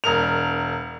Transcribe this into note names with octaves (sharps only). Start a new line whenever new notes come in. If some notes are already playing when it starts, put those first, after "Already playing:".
E1 A#4 F7